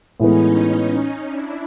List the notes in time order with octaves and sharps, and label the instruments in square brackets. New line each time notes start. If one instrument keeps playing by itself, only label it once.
[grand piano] A2 E3 G#3 B3 [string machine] C#4 D#4
[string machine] D4 E4